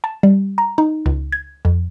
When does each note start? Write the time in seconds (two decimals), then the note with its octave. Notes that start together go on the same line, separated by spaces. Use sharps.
0.04 A5
0.23 G3
0.58 A#5
0.78 D#4
1.06 C#2
1.32 G#6
1.65 F2